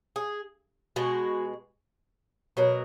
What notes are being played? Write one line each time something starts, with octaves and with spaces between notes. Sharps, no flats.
G#4
B2 G#3 F#4
B2 F#3 A#4